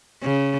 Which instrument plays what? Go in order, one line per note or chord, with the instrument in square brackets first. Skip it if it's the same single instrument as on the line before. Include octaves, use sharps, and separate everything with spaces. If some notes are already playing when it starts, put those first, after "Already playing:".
[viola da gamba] C#3